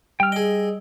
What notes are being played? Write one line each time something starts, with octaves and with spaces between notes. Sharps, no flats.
G3 G5 E6 F6
G#4 D#5 G5